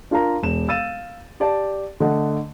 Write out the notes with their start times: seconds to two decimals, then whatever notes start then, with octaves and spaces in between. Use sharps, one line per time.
0.11 D4 F4 A#4 F5 A#5
0.43 E1 E7
0.68 F5 E6 A6 D#7 E7
1.40 G4 D5 A5
2.00 D3 A3 D#5 F#5